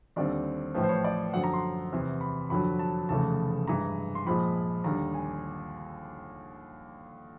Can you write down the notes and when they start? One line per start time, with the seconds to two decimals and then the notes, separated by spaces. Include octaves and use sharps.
0.16 D#2 D3 G3 C4 D5
0.74 A1 A2 F3 B4
0.83 C5
0.89 C#5
1.04 D5
1.33 F#2 D3 F3 F#5
1.44 A#5
1.53 C6
1.92 E2 C3 E3
2.21 B5
2.50 F2 D3 F#3 B5
2.79 A5
3.09 F1 E2 C#3 E3 A3 A5
3.67 G2 E3 G#3 A#5
4.15 C6
4.26 A#1 A#2 F3 G#3 B5
4.84 D#2 D3 G3 A#5
5.14 G#5